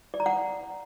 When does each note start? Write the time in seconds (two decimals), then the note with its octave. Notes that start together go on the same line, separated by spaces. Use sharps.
0.14 D5
0.20 A#5
0.26 F#5